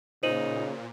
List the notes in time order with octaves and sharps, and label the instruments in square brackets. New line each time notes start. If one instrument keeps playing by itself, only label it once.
[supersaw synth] A#2 [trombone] C#3 [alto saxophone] D#4 [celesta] C5 D#7 F#7